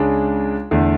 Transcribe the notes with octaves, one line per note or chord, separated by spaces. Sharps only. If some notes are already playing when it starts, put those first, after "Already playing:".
Already playing: C#2 C#3 G#3 D4
E2 D3 A3 E4